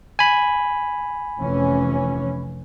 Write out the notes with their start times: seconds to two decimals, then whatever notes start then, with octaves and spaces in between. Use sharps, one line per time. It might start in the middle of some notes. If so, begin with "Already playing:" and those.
0.19 G#5 B5
1.40 F1 E3 C#4